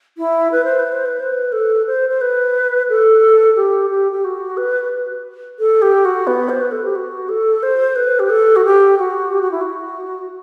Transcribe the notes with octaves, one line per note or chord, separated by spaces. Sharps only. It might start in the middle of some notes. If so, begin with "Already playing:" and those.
E4
B4
C5
B4
C5
B4
C5
B4
A4
C5
C5
B4
A4
G4
G4
G4
F#4
B4
A4
G4
F#4
B3
C5
B4
A4
G4
F#4
A4
C5
B4
G4
A4
F#4
G4
F#4
G4
F#4
E4
F#4